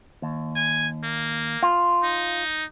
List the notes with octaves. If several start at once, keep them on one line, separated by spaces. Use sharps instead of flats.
D#2
G#5
A#3
F4
D#4